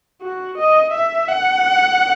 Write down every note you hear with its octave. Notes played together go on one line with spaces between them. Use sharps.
F#4
D#5
E5
F#5